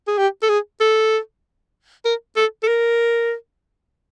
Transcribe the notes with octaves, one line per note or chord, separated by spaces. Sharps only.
G#4
G4
A4
G#4
A4
A#4
A4
A4
A#4